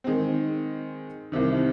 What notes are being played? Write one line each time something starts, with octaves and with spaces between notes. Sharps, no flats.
D#3 G#3 C4
C2 C3 D#3